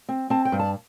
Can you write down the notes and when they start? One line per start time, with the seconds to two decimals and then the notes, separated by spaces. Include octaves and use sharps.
0.09 C4
0.30 C4 A5
0.45 G5
0.52 G2
0.60 A5